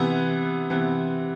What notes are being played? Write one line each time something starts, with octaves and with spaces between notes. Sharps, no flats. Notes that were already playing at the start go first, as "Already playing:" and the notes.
Already playing: C3 E3 B3
C3 E3 B3